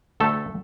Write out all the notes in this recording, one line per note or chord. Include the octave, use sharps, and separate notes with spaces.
D2 A3 A4